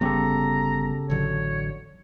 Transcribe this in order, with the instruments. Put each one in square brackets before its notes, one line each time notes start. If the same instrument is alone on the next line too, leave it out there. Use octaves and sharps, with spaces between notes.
[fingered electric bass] G1 G3 B3 [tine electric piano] C#3 G4 A4 [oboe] A#5
[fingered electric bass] A1 D3 F#3 [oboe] C#5